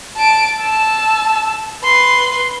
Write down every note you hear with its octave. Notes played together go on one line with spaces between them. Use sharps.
A5 D7
A5 E6
B4 C6